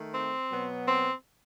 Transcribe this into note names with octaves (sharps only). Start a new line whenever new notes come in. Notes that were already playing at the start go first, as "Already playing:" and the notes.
Already playing: D#3 A3
C4
B2 F#3 B3
C4